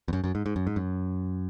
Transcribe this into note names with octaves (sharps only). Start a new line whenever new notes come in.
E2
F#2
F#2
G#2
G#2
F#2
G#2
F#2